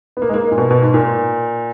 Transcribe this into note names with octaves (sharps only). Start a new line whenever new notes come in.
B3
A#3
G#3
A#3
A#2
B2
B2
G#2
A#2